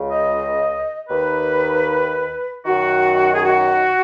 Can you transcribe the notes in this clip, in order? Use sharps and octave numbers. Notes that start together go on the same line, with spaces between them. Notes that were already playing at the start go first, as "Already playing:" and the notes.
Already playing: C#2 C#3
D#5
D#2 D#3 B4
F#2 D#3 F#4
G#4
F#4